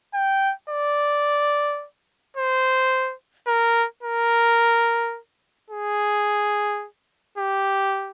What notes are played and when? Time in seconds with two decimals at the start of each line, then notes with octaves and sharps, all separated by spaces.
0.14 G5
0.70 D5
2.37 C5
3.47 A#4
4.03 A#4
5.70 G#4
7.38 G4